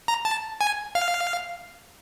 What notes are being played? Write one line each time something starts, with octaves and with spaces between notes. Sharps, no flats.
A#5
A5
G#5
F5